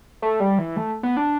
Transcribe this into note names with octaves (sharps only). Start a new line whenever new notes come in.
A3
G3
E3
A3
B3
D4